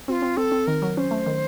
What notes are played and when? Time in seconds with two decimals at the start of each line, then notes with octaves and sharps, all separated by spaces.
0.08 C4 F#4
0.12 F4
0.22 C4
0.37 C4 A4
0.52 C4
0.67 D#3 A#4
0.82 F#3
0.97 C#4 C5
1.11 A3
1.26 D#3